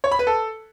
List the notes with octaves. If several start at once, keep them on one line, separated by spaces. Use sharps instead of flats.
C#5
B5
B4
A4